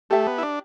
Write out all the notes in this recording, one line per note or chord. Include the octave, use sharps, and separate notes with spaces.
A3 G4 E5 A5
B3
E4
D4